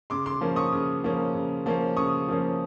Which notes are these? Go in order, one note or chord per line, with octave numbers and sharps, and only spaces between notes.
C#3 C6 D6
C6 D6
F3 A#3 C#4
C#6 D#6
C#3
F3 A#3 C#4
C#3
F3 A#3 C#4
C#3 C#6 D#6
F3 A#3 C#4